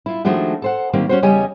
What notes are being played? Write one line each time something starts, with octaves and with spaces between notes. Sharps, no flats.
E4 F4
D#3 F3 G#3 A3 D4 F#4
A4 C5 F#5
D#3 G3 A#3 C4
C#4 F#4 C5
E2 C#3 G3 C#5 D#5 G#5